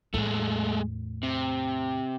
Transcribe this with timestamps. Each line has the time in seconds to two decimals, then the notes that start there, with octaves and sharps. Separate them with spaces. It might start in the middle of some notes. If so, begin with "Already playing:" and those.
0.14 E2 A2 G#3 A3
1.23 C3